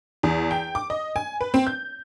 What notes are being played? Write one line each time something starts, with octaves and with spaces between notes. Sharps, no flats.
E2
G5
D6
D#5
G#5
B4
C4
G6